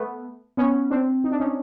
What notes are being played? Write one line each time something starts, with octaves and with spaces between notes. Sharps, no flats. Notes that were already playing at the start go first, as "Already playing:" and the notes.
Already playing: A3 B3
B3 C#4
C4 D4
D#4
D4
C#4 D#4